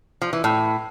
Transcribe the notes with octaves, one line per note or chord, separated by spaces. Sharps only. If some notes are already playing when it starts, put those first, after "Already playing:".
F3
E3
A2